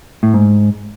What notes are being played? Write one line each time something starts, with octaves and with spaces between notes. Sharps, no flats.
A2
G#2